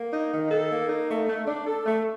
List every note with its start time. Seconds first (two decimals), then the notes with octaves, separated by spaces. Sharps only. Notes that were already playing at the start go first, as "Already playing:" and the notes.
Already playing: A#3
0.12 D#4
0.31 D#3
0.51 A4
0.69 A#3
0.89 D#4
1.08 A3
1.28 A3
1.47 D4
1.66 A4
1.85 A3